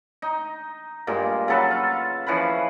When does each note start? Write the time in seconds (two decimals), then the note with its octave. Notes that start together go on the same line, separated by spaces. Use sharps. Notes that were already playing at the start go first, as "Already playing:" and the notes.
0.22 D#4
1.07 G2 A#2 G#3
1.48 C#3 F#3 A4 B4
1.71 F4
2.27 E3 F3 C#4 B4